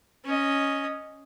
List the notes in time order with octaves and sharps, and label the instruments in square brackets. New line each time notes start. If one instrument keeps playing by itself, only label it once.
[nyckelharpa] C#4 D#5